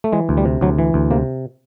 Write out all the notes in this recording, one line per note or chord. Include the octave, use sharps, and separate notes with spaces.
A3
E3 G#3
D2
G3
C3
D2 F#3
E3
D2
C3 A#3